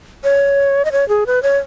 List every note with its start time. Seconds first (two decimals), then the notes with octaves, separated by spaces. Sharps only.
0.24 C#5
0.85 D#5
0.92 C#5
1.09 G#4
1.27 B4
1.43 C#5